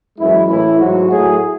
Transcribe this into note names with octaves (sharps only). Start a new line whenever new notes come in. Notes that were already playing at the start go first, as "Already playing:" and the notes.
F#2 E3 G#3 E4
A2 E3 A3 E4
G#2 F#3 A3 F#4
A2 F#3 A3 G#4